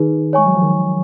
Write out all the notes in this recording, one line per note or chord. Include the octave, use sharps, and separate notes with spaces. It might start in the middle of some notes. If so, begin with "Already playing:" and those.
Already playing: D#3 D#4 G#4 B4
G#3 C#5 G#5 C#6
F#3
F3
D#3